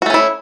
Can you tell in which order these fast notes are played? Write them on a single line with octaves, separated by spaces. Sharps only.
F#4 A3 C#4 E4